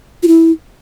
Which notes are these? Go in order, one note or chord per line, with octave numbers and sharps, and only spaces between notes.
F4
E4